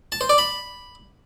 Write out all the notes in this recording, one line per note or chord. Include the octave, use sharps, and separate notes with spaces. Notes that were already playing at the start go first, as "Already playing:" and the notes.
A5
C5
D5
B5